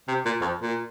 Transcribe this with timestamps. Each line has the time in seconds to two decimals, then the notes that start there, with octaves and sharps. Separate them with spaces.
0.08 C3
0.25 A#2
0.41 F2
0.62 A#2